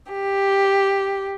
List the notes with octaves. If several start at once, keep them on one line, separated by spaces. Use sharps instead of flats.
G4